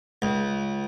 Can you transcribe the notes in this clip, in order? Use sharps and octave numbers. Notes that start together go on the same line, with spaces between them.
C#2